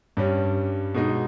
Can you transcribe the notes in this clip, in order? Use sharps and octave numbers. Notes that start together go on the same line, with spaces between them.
G2 G3 C#4
B2 G#3 D#4